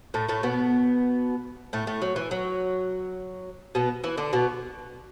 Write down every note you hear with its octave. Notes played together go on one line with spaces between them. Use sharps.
A2 A3
A2 A3
B2 B3
A2 A3
A2 A3
F#3
E3
F#3
B2 B3
E3 E4
D3 D4
B2 B3